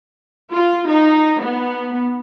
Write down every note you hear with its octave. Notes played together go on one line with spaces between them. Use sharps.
F4
D#4
B3